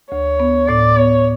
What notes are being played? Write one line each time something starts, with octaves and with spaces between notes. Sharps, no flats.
D2 C#5
B3
A2 D5
B3 C#5